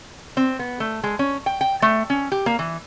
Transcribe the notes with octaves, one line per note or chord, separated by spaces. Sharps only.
C4
B3
A3
G#3
C#4
G5
G5
A3
C#4
G4
A#3
E3